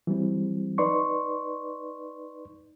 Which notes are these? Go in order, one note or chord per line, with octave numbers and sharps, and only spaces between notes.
E3 F#3 G3 C4
D#4 B4 D5 C6 C#6